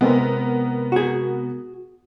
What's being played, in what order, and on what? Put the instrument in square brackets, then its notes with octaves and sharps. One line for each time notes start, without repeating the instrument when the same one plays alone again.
[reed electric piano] C3 G#3 C4 [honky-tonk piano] B3 A#4
[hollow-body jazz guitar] F#4 G#4